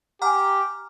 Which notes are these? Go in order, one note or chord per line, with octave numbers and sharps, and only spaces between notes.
G4 F#5 G#5 A#5 D6 F6